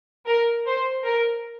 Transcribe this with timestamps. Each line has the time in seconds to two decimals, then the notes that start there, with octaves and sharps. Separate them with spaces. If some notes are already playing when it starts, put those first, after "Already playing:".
0.27 A#4
0.67 C5
1.04 A#4